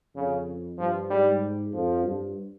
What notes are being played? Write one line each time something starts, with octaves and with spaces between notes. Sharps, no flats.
F2 C#3
G2 F3
G#2 G3
F2 F3
G2